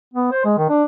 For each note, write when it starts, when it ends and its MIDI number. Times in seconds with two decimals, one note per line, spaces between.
0.13 0.30 59
0.32 0.41 72
0.45 0.57 56
0.58 0.69 51
0.69 0.84 62